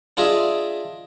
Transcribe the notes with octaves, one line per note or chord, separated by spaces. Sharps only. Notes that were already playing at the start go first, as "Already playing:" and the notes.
D4 F4 G#4 D#5 E5